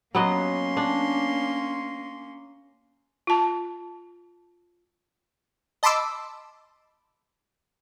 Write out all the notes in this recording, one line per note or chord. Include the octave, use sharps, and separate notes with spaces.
F#3 A#3 B3 C#4 D#5 C6
D4
F4 A5
D#5 A5 B5 C6 D6 E6